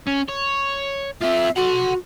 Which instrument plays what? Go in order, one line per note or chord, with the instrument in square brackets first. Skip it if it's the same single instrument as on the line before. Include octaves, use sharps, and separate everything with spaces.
[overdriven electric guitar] C#4
C#5
[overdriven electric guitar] C4 F4 [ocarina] E5
[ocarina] F#4 [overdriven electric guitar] F#5 C6